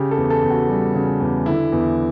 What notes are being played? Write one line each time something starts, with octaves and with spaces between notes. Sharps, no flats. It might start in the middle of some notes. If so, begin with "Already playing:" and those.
Already playing: C#3 G4
A4
E2
A4
E2
F#4
G3
C#3
E2
D3 E4
E2